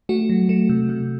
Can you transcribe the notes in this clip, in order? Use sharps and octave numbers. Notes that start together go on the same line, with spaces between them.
A3 F#4
F#3
A3
C3
C3